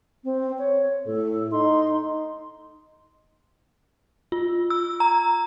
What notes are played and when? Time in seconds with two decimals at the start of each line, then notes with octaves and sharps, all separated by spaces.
0.24 C4
0.59 C#5
1.06 A2 A4
1.52 D#4 C6
4.32 F4
4.70 E6
5.00 A#5